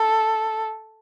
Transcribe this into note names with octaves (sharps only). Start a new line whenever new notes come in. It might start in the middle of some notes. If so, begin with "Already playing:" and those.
Already playing: A4